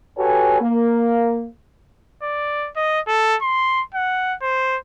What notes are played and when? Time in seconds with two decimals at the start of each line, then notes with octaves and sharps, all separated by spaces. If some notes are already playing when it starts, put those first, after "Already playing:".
0.17 F#4 G4 A4 B4 C#5 G#5
0.61 A#3
2.22 D5
2.76 D#5
3.07 A4
3.42 C6
3.95 F#5
4.42 C5